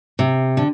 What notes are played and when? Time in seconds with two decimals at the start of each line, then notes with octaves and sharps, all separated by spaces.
0.19 C3
0.57 D3